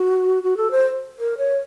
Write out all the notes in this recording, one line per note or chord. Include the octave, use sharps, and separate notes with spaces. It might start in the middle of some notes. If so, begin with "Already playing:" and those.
Already playing: F#4
F#4
A4
C5
A#4
C#5